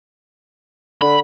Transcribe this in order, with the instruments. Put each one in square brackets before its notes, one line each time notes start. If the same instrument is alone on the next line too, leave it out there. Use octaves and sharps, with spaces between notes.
[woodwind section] D3 [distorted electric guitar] B5